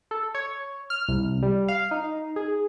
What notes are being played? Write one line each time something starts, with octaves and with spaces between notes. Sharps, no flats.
A4
C#5
F6
C2
G3
F5
D#4
G#4